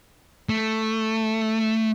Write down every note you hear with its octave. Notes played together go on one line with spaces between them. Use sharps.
A3